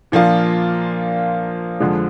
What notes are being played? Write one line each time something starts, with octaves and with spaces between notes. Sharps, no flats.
A#2 F3 A#3 D4 F4
F2 D3 F3 G#3